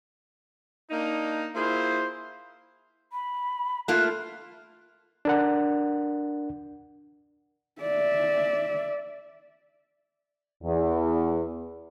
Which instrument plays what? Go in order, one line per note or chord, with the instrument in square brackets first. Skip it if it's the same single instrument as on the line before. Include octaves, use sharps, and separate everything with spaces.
[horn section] A#3 D4 D#4
A#3 E4 F4 G#4 C5
[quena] B5
[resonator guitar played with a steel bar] A3 A#3 F4 [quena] F#6
[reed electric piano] D4 A#4 F#5
[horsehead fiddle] D5 E5
[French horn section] E2